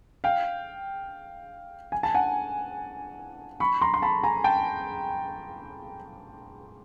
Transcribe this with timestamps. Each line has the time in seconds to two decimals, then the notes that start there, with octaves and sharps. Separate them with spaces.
0.24 F5 G5
1.92 G#5
2.03 A5
2.15 F#5 G#5
3.60 B5 C#6
3.81 A#5 C6
3.94 C6
4.02 A5 B5
4.24 G#5 A#5
4.44 G5 A5